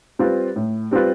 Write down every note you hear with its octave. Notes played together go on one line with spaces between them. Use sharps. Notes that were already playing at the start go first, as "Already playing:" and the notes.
G3 C4 F4 B4
A2
G3 C4 F4 B4